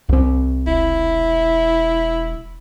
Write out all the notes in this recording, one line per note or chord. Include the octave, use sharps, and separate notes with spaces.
C2 C4
E1 E4